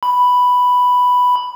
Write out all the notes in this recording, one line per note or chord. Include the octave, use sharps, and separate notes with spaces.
B5